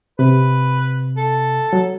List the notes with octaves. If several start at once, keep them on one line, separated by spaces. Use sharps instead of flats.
C3 B4
A4
F#3